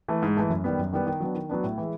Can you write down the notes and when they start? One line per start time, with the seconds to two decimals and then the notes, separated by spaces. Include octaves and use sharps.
0.08 E3 A3
0.22 G#2
0.37 E3 A3
0.50 F#2
0.64 D#3 G3 B3
0.79 F#2
0.93 D#3 G3 B3
1.07 D#3
1.20 F#3 B3 D4
1.34 D#3
1.49 F#3 B3 D4
1.64 A2
1.78 E3 G#3